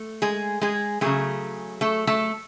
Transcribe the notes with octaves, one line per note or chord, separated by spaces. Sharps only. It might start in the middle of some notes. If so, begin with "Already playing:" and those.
Already playing: A3
G#3 G#4
G#3 G#4
C#3 F#3 G#3 A3 G#4
A3 A4
A3 A4